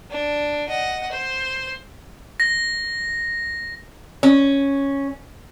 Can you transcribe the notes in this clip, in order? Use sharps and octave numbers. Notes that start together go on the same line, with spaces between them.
D4
D#5 F#5
C5
A#6
C#4